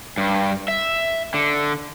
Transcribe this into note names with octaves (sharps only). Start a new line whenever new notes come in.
G2
E5
D3